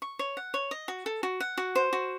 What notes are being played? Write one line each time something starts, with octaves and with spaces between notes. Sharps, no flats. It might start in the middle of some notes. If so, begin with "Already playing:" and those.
C#6
C#5
F#5
C#5
D#5
F#4
A4
F#4
F#5
F#4
C5
F#4